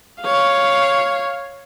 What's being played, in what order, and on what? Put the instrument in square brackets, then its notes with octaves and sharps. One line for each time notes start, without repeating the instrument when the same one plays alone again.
[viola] C#5 F5